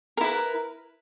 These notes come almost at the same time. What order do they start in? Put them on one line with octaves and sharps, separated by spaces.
A#4 E4 B4